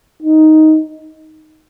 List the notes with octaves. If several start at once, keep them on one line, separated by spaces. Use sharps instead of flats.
D#4